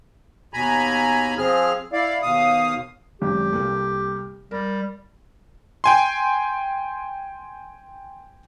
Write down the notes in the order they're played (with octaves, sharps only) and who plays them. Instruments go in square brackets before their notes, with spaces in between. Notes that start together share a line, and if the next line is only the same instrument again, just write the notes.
[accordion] D#2 B2 G#5 A#5 B5
F3 C4 G#4 F6
E4 D5 F5
D#2 B2 F5 D#6
[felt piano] G#1 F#2 [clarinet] G4
[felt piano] C2 A#3 A4
[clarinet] G3 [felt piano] A#4
[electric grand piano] G5 G#5 C6